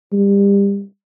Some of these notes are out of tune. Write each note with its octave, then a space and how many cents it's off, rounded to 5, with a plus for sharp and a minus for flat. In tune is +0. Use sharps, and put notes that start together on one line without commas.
G3 +30